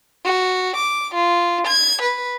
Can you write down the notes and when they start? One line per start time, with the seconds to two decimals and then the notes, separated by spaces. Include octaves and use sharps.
0.25 F#4
0.77 D6
1.15 F4
1.67 G#6
2.02 B4